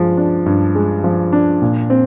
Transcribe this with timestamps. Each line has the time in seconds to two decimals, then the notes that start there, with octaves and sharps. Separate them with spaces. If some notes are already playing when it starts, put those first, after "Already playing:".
Already playing: G2 F3 G#3
0.17 D4
0.46 G2
0.75 G#3
1.04 F3
1.33 D4
1.62 A#2
1.90 C4